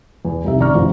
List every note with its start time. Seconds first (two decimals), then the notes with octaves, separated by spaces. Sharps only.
0.25 E2
0.44 C2 F2 D#4 G4 E5
0.59 D#1 A1 D5 A#5 C#6 F6
0.75 A1 F3 E4 C5